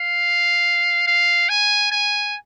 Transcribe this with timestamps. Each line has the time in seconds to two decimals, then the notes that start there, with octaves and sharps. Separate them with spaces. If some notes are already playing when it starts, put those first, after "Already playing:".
Already playing: F5
1.07 F5
1.49 G#5
1.92 G#5